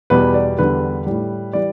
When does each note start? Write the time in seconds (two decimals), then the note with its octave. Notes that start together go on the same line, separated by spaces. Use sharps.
0.10 E2 B2 G3 B4
0.34 D5
0.58 E2 D3 G3 B4
1.06 A2 G3
1.53 E3 G3 D5